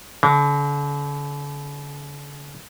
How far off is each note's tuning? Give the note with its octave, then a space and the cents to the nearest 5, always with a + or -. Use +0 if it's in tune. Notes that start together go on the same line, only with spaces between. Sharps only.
D3 -45